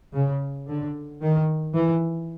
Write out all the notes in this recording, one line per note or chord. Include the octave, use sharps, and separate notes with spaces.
C#3
D3
D#3
E3